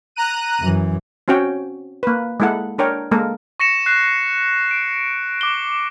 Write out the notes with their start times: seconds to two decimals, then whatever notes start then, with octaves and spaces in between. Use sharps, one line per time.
0.16 A#5 F#6 D#7
0.60 F#2 E3
1.28 C4 C#4 F#4 C#5 G5
2.03 A#3 B4
2.40 G#3 A#3 E4 A4 F#5
2.78 D4 A#4 C#5 G5
3.11 G#3 A#3 A4 A#4
3.60 C#6 A#6 C#7 E7
3.86 F#6 C7
4.71 D7
5.41 D6 G7